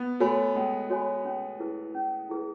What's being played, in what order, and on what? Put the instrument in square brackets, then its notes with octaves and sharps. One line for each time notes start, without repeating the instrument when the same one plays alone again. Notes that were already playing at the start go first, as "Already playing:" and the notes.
Already playing: [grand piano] B3
[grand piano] A3 [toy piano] F#4 C#5 G#5 B5
[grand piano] G#3 [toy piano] C#4
[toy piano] F#4 C#5 G#5 B5
C#4
E4 G#4 B4
C#4
E4 G#4 B4